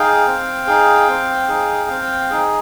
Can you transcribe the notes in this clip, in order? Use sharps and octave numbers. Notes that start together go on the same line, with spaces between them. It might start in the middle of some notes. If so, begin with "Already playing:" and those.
Already playing: D#4 G#4 F5 G5
C4
D#4 G#4
C4
D#4 G#4
C4
D#4 G#4